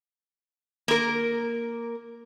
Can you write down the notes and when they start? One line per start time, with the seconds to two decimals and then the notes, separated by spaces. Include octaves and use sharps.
0.88 A#3 A#4